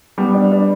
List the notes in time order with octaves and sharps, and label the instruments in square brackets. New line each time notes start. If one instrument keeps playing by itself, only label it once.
[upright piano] G3 [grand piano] B3
[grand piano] D4
D4